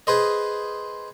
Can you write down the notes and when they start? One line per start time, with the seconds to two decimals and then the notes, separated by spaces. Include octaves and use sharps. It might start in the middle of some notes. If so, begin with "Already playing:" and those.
0.07 G#4 B4 C5 D#5